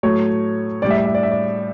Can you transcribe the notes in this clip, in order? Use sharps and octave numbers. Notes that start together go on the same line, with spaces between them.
A2 F#3 A3 C#5
A2 G3 D5
E5
D5
E5
D5
E5
D5